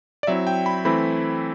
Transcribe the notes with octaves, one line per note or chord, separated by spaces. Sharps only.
D5
F#3 C4 E4 E5
G5
B5
E3 A3 C4 E4 B5